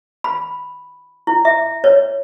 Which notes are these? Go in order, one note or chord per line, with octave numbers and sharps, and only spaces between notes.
B5
E4
E5
C#5